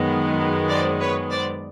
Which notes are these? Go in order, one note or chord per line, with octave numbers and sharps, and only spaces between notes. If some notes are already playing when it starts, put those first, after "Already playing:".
Already playing: F#2 D#3 G#3 B3
C5 D5
B4 C#5
C5 D5